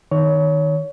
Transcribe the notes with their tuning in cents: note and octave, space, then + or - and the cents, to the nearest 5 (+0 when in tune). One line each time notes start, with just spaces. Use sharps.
D#3 +0 C#5 +20